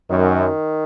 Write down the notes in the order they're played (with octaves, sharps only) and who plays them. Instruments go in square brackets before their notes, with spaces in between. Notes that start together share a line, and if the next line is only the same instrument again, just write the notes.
[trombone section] F#2 [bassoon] D#3